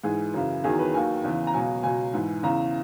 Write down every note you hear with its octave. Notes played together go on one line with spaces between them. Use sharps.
G#2 E3 G#4
F#2 C#3 E3
E2 D#3 F#3 G#4
B4
D#2 D#3 F#3 G#5
E2 C#3 E3
A#5
C#2 B2 F#3 G#5
C#2 B2 F#3 G#5
G#2 E3
E2 C#3 E3 A#5